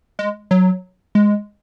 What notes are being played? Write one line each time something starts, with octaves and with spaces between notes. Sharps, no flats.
G#3
F#3
G#3